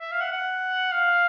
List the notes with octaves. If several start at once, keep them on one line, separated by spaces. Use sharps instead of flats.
E5
F5
F#5
F#5
F5